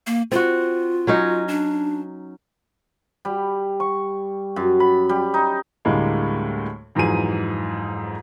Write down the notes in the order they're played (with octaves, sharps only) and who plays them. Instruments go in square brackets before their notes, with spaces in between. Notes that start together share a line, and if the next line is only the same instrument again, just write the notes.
[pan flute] A#3
[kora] C4 F#4 [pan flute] F4
[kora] F#3 C#4 D#4
[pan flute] D4
[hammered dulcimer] G3
C#6
F#2
B5
G3
D#4
[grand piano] D2 A2 D3 G3 G#3 A#3
F2 G#2 E3 F#3 G#4 D#7